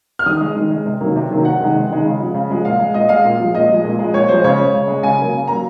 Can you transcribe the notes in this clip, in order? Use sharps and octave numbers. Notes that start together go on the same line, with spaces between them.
F6
D#3 D#6
G#3
D#3
G#3
C3
D#3 F#3 A#3
C3
D#3 F#3 A#3
C3 F#5
D#3 G#3
C3
D#3 G#3
C#3
F3 G#3
C#3
F3 G#3
A#2 F5
G#3
A#2 D#5
G#3 F5
A#2
F3 G#3
A#2 D#5
F3 G#3
A#2
F3 G#3
A#2 C#5
F3 G#3 C5
C#3 C#5
G#3
C#3
G#3
C#3 G#5
F#3 A#3
C#3
F#3 A#3 A#5